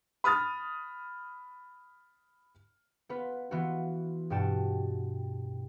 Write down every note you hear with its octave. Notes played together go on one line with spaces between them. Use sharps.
B5 D#6 F6 A6
B3 F4 B4
E3 B3 F4 F#4
G2 B2 F#4 G5 A5 E7